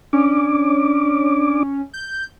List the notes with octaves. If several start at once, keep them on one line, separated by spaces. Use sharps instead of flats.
C#4 D4 D6
G6